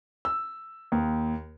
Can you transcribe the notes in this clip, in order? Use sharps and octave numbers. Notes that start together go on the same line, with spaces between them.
E6
D#2